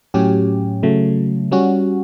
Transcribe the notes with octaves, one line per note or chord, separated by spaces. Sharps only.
A2 F#3 C#4 G4
C#3 F#3 A3
G3 C#4 F#4